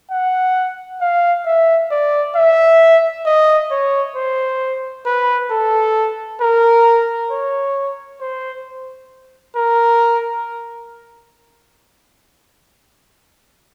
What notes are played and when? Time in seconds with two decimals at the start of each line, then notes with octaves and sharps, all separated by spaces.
0.11 F#5
1.01 F5
1.46 E5
1.91 D5
2.36 E5
3.26 D#5
3.71 C#5
4.16 C5
5.06 B4
5.51 A4
6.41 A#4
7.31 C#5
8.21 C5
9.56 A#4